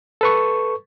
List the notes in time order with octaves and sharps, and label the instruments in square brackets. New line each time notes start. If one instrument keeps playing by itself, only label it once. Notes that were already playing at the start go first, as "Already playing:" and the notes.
[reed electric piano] A4 B4 C#6